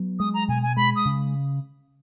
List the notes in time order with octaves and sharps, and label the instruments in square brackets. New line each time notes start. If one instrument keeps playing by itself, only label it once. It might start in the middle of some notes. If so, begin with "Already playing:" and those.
Already playing: [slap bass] F#3 B3
[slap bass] G#3 [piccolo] D#6
[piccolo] A#5
[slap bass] B2 [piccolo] G#5
[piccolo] G#5
[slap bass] G#3 [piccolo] B5
[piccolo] D#6
[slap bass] C#3